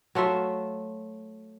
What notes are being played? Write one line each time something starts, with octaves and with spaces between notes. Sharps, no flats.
F#3 A3 F4 E5